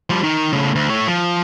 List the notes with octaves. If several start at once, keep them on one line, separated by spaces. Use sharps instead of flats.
F3 G3
D#3
A2 C#3
D2
A3 C#5
F3